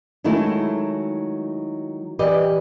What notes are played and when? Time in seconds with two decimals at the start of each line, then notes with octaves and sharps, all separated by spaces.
0.24 D#3 F#3 G#3 A3 E4
2.19 E3 G4 B4 D5 D#5